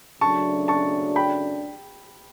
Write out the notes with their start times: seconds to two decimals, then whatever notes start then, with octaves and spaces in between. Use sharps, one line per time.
0.21 F#2 C#3 F#3 A3 D4 A5 C#6
0.68 A5 C#6
1.16 G5 B5